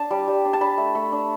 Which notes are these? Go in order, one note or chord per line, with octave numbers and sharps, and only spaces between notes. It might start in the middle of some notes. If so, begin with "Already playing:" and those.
Already playing: D4 A5
G3
G3
D4
A5
D4 B5
A3
A3
D4